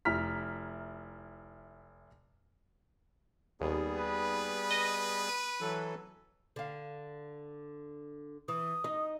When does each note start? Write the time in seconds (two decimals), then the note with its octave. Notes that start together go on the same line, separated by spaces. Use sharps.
0.05 F1 E4 A#5 F6 B6
3.61 D#2 G3 B3 G#4
3.98 B4
4.71 D#5
5.28 D#7
5.61 E3 F#3 A4
6.56 D3 F5
8.48 E3 D#6
8.84 D#4 D#5